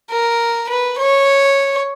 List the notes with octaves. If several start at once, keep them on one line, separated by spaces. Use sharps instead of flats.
A#4
B4
C#5